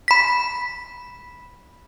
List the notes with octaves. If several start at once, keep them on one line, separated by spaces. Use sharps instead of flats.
B5 B6